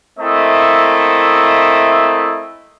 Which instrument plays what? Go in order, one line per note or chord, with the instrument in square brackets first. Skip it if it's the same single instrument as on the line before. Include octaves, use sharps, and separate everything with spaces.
[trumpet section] A3 A#3 C4 E4 D#5